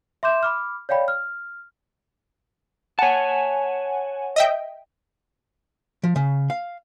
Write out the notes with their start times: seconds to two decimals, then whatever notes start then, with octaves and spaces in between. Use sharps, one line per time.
0.23 E5 C6 D6 G6 E7
0.43 B5 D6 F6
0.89 C#5 D5 F5 G5 B5
1.08 F6
2.99 C#5 F#5 G#5 A5
4.36 D#5 E5 G5
6.03 F3
6.16 C#3
6.50 F5